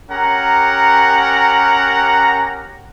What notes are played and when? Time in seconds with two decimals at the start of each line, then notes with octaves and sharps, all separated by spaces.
0.11 C#4 G4 A#4 F#5 A#5